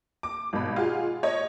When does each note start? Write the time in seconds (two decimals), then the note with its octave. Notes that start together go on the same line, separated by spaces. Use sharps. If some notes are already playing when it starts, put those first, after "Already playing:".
0.23 D6
0.53 G#1 B2 B5
0.76 F4 F#4 G#4
1.23 C#5 D#5